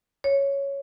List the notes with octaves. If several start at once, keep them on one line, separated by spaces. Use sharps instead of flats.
C#5